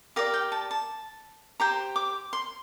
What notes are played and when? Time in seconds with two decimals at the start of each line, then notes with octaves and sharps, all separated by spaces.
0.16 G4 A#4 D5 F5
0.34 G5
0.52 A5
0.71 A5
1.60 G4 C5 A#5
1.96 D6
2.33 C6